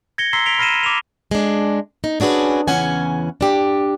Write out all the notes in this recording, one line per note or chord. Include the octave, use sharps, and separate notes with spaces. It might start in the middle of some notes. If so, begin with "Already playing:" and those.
G#6 A#6 C#7 G7
A#5 C6 E6 B6 C7 G7
B6 C7 D7 F7 G7
B5 F6 A#6 C7 D#7 E7
D6 E7 F7
G#3 D4
D#4
C#4 D4 F#4 G#4 B4
E2 C#3 E3 C#4 F#5 G#5
D4 G4